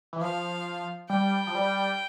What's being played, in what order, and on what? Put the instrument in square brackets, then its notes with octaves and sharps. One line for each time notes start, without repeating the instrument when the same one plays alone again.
[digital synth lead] E3
[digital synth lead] F3 [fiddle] F5
[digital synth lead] G3 [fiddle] G5
[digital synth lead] F3
G3